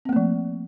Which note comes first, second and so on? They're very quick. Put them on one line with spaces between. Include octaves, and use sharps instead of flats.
C4 A#3 A3 F3